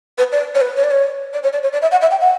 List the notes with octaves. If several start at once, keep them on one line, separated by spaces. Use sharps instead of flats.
B4
D5
C#5
B4
C#5
D5
C#5
D5
C#5
D5
C#5
D5
E5
F#5
E5
G5
F#5